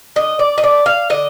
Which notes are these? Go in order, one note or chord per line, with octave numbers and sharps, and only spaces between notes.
D3 D#5
D5
D#5
A3 D5
F5
D3 D#5